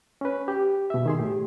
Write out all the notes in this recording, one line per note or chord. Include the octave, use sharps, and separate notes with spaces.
C#4 B4
G4
B2 E5
D#3 G#4 C6
A2 G4